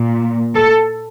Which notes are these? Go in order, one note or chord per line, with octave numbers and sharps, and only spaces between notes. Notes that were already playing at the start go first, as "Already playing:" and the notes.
Already playing: A#2
A4